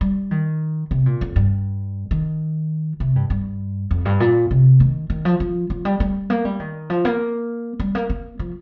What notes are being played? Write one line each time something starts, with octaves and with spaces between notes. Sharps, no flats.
G3
D#3
C3
A#2
F2
G2
D#3
C3
G2
G2
F2
G2
A#2
C3
D#3
D#3
F3
F3
F3
G3
G3
A#3
G3
D#3
F3
A#3
G3
A#3
A#3
F3